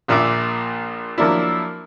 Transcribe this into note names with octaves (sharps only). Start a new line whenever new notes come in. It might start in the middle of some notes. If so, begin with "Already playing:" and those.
A#1 A#2 E5 D6
F3 F#3 A#3 D4 E4